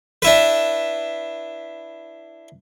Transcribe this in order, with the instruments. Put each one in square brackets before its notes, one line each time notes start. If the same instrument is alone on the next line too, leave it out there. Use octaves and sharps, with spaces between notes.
[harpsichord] D4 E4 B4